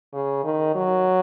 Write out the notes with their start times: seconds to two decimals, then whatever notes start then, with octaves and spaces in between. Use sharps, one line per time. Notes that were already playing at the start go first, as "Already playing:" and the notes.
0.13 C#3
0.44 D#3
0.75 F#3